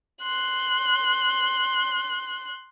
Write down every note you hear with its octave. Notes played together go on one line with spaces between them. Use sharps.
C6 F#6